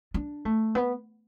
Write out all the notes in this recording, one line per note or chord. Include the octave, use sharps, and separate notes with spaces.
D4
A3
B3